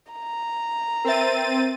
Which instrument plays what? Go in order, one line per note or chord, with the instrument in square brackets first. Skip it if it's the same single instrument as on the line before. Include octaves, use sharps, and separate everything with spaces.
[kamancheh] A#5
[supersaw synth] C4 A6 D#7 [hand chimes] A#4 B4 E5